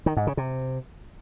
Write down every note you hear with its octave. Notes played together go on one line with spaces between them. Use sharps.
D#3
G#2
C#3
C3